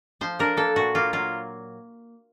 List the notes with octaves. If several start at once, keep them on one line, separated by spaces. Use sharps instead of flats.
F3 C5
D4 A#4
A#3 A4
A#2 F#4
A#3 F4
F#3 F4